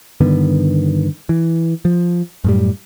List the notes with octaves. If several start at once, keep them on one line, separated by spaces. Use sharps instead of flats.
G2 D3 D#3 B3
E3
F3
F#2 A2 G3